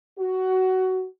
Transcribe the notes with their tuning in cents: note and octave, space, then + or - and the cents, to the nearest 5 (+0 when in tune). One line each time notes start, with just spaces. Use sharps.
F#4 +15